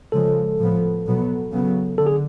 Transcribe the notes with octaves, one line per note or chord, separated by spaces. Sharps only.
C#3 F3 G#3 A4
A2 F3 B3
B2 F#3 B3
C#3 F#3 B3
D3 A4
G#4